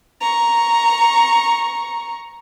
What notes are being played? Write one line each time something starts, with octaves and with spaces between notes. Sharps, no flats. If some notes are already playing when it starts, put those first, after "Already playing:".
A#5 C#6